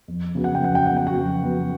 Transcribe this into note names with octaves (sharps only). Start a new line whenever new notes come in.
F2
C#3 F#3 B3
F#5
G5
F2 F#5
G5
C#3 F#3 B3 F#5
G5
F#4 F#5
F2
C#3 F#3 B3